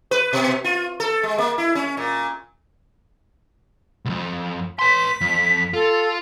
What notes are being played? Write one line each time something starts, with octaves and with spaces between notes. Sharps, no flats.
B4
B2
F4
A4
G#3
A#3
E4
C#4
A#2
C2 F2
B4 C6 B6
F2
F4 A4